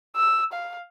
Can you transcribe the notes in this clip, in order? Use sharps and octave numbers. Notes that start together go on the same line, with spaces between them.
E6
F5